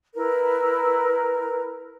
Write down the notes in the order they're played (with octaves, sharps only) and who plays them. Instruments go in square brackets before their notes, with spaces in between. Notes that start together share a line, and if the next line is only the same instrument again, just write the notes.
[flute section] E4 A#4 B4